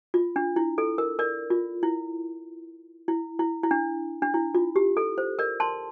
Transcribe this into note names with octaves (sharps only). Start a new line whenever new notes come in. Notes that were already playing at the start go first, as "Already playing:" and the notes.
F4
D4
E4
A4
A#4
A#4 D5
F4
E4
E4
E4
E4
D4
D4
E4
F4
G4
A4
C5
A#4 D5
A5 C6